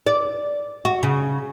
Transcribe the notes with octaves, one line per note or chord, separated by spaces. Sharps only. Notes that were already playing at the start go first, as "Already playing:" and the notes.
D5
F#4
C#3